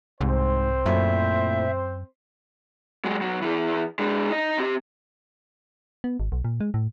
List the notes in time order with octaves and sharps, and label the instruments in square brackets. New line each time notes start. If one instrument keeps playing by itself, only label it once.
[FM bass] C2 [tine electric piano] G#2 [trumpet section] C4 C5
[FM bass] F#2 [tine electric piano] A#2 A3 E4 [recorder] E5
[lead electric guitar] F#3 G#3
B1 F#3
E3 G#4
G#3 D4
D#4 D#5
C4 G4
[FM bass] B3
G#1
B1
A#2
G#3
A2